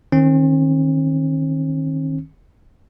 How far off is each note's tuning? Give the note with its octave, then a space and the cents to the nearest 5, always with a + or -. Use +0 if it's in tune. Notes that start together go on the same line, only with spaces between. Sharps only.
D#3 +0 C4 +45